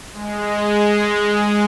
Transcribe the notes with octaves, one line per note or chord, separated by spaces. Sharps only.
G#3